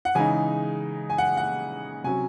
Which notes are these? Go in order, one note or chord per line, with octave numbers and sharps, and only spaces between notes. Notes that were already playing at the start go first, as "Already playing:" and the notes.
F#5
C#3 E3 G#3 D#4 G#5
G#5
F#5
F#5
C3 F#3 C#4 G#5